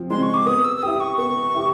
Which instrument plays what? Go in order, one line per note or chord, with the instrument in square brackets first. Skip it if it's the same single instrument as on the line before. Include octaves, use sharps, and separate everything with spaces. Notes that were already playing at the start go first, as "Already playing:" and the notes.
Already playing: [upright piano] F3 C4
[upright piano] G#3 C4 [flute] C6
[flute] C#6
D6
[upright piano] B3 [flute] D#6
[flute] E6
E6
[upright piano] E4 G4 [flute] D#6
[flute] C#6
[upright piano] B3 [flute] C#6
[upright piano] E4 G4